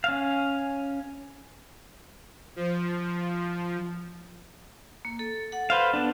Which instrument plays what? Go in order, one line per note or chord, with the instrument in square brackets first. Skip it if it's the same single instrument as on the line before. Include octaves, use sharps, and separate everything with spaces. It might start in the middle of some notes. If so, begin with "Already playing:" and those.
[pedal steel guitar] C#4 F5
[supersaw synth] F3
[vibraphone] A#3
A4
A4 F#5
[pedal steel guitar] B4 C5 F5
B3 D4